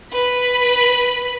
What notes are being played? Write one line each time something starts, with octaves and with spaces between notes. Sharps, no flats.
B4 B5